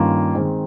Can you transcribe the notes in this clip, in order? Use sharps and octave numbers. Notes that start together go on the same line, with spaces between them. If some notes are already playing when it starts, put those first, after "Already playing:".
Already playing: G2 D#3 A#3 C#4 F4
D#3 G#3 C4